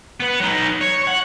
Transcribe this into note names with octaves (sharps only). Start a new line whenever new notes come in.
B3 B4
F#3 D#4
C#5
F#5